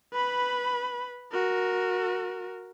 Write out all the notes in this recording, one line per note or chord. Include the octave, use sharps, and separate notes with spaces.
B4 B5
F#4 A#4